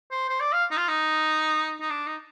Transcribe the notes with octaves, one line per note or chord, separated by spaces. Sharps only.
C5
C5
D5
F5
D#4
F4
D#4
D#4
D4
D#4